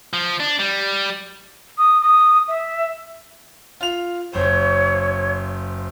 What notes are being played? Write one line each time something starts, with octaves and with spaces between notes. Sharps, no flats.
F3
D4
G3
D#6
D#6
E5
F4 F7
F#1 C5 C#5